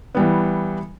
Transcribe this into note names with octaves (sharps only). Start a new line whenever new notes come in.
E3 G3 B3